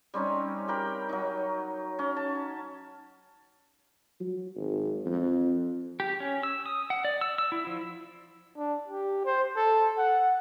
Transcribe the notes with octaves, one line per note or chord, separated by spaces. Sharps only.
G3 C4 C#4 D#4
G4 A#4 G5 B5
F#3 D#4
C#4
A5
F#3
G#1
F2
G4
C#4
E6
D#6
F#5
D5
E6
E6
E4
F3
D4
G4
C5
A4
F#5